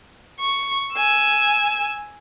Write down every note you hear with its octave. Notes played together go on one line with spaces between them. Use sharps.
C#6
G#5 E6